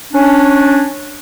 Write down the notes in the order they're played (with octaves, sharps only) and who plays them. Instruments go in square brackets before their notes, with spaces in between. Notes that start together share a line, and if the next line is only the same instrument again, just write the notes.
[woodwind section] C#4 D4